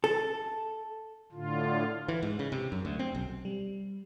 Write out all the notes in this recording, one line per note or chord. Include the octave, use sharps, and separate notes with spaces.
A4
A2 D3 F4
E3
G#2
C#3
C3
F#2
D2
C4
B1
G3